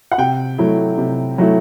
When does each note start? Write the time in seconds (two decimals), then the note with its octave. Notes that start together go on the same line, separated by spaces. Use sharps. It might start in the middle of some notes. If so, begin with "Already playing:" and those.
0.12 F#5
0.18 C3 G5
0.58 F#3 A3 E4
0.98 C3
1.38 F#3 A3 E4